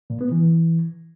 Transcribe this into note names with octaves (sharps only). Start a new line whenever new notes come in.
A#2
B3
E3